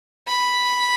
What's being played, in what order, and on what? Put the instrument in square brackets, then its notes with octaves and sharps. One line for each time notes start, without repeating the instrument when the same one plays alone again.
[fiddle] B5